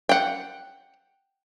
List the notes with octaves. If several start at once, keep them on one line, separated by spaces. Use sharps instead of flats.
F#5 G5